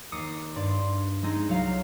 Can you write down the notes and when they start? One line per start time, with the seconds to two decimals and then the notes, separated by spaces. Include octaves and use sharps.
0.12 D#2 D6 D#6 C7 C#7
0.56 G2 D5 C6
1.23 G#3 C4 D#4
1.48 C2 F#3 F4 F5